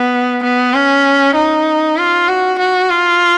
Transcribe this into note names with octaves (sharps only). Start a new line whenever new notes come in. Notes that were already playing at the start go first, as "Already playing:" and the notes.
Already playing: B3
B3
C#4
D#4
F4
F#4
F#4
F4